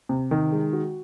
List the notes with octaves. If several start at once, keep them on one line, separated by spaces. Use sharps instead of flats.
C3
D#3
G#3
F#4